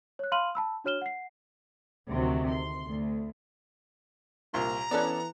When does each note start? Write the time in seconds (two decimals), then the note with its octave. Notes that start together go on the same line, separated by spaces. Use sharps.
0.19 C#5 F#6
0.32 F5 B5 C6 F6 D#7 F#7
0.55 A5 B5 E6
0.84 D4 F#4 C#5 F6 E7 G7
1.02 F#5 C7
2.09 D2 C3 D#3 F#3
2.48 C6
2.88 D2
4.54 C2 A#2 A#3 A#5 C6
4.91 E3 B3 C#4 A4 D5 F#6